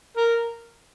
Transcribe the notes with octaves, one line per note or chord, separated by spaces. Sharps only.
A#4